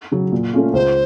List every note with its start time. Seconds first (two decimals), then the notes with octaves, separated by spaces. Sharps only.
0.12 C#3 F#3
0.32 A#2
0.53 A3 C#4 F4
0.73 C#2 C5